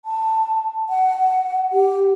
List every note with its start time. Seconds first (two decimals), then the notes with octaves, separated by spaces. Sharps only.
0.05 A5
0.89 F#5
1.72 G4